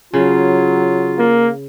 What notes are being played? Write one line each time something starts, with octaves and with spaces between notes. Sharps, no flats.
C#3 F#3 F4
A#3